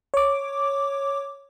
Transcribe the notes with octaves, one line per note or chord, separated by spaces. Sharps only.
C#5 D6